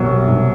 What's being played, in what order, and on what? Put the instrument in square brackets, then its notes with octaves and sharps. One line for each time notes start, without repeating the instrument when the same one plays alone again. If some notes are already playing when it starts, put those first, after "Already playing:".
Already playing: [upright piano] C2 B2 F#3
C2